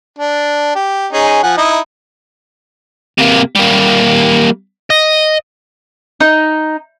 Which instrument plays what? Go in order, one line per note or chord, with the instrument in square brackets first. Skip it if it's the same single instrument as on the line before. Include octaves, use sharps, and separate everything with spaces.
[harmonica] D4
G4
C#4 D#4 G#4
F3 F#5 G#5
D#4 E4 D#5
[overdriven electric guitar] C3 A#3
G3 A#3
D#5
[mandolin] D#4